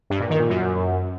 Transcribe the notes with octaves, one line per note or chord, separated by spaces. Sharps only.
G2
A#2
D#3
A#2
F#2